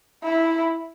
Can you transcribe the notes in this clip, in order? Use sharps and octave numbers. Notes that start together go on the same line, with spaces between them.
E4